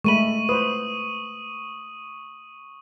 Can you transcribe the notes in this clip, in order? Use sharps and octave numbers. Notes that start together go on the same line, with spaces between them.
G#3 A3 B5 C#6 D#7 F#7
B4 C5 D#6